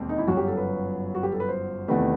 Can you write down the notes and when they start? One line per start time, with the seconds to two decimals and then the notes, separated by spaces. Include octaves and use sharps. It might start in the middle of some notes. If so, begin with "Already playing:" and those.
Already playing: E1 D#2 D#3 C4
0.09 D#4
0.18 E4
0.27 G1 F#2 F#3 F#4
0.37 G4
0.47 A4
0.57 B4
1.15 F#4
1.23 G4
1.32 A4
1.40 B4
1.48 C5
1.88 E2 C3 D#3 A3 B4